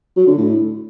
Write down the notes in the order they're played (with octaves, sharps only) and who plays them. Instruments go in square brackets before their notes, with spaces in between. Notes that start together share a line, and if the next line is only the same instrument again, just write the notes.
[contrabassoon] F#3
D3
A2